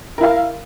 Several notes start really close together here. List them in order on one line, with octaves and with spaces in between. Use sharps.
A#4 E4 F5